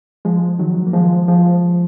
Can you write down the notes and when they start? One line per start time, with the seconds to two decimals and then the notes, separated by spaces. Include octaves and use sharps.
0.25 F3 G#3
0.59 D#3 F#3
0.87 A#3
0.93 F3 G#3
1.28 F3 G#3